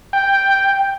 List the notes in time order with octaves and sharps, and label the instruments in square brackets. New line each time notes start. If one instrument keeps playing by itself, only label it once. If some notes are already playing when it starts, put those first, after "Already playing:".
[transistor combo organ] G5